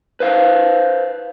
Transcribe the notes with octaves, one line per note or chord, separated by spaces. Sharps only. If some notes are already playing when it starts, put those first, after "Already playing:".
B4 C5 F5